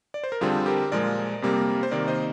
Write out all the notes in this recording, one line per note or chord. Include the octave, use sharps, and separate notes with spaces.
D5
C5
A#4
F2 D3 G3 C4 F4 G#4
G4 A#4
A#2 F3 G#3 A#4 D5
F2 C3 G3 A#3
C5
C3 D#3 A#3 A#4 D5
C5 D#5